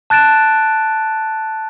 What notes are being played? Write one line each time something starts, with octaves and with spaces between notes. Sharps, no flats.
A5 F#6 A6 D7 E7